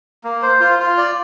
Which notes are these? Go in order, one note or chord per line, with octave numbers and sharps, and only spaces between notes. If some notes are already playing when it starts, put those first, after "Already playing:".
A#3
C5
F4
F4
D5